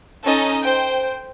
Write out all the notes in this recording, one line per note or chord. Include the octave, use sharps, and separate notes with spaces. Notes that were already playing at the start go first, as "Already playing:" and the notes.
C#4 D#4 A4 D#5
C5 G5